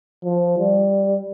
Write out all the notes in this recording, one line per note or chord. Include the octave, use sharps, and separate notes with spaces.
F3
G3